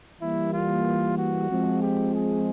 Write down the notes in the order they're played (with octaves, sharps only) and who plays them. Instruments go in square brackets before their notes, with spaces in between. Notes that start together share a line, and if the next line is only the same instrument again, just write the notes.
[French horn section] E3 G3 A#3 [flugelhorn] E4
[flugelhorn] F4
F#4
[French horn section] F3 G#3 C4
[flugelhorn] G4
G#4